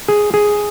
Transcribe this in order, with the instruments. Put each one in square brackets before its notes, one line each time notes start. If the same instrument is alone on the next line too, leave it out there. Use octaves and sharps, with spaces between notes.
[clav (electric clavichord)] G#4
G#4